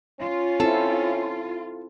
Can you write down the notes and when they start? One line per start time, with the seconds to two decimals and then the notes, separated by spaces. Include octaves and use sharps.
0.20 C#4 F4
0.60 C4 E4 A4